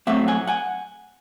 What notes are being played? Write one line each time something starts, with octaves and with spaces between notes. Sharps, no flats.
A2 F#3 A3 C4 E5 F#5
F#5 G#5
F#5 G#5